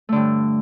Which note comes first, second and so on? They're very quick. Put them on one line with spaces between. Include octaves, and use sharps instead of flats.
A3 D3 G2